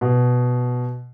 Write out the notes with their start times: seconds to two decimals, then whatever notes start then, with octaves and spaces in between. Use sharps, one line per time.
0.01 B2